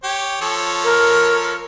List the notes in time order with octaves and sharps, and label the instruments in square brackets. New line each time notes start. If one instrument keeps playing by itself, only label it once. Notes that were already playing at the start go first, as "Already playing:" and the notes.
[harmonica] G4 C#5
F3 A4 C#5
[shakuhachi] A#4